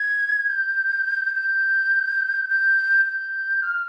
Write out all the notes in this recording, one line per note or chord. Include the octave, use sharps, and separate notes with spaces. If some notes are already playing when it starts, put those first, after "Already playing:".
Already playing: G#6
G6
G6
G6
G6
F6